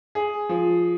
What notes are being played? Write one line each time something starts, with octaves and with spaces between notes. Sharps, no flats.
G#4
F3